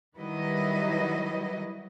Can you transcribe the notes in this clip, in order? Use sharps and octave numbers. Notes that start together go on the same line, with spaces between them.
D#3 F#3 G3 E4 B4 D#5